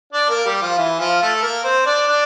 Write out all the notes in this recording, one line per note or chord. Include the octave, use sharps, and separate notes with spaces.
D4 D5
A#3 A#4
G3 G4
F3 F4
E3 E4
F3 F4
A3 A4
A#3 A#4
C4 C5
D4 D5
D4 D5